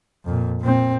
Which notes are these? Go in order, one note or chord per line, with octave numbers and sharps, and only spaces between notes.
F2 A#2
A#2 C4